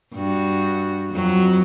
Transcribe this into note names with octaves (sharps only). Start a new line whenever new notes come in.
G2 F#4
F2 F#3